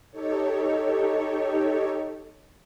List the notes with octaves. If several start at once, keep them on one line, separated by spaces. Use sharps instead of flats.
D#4 G4 A4 C#5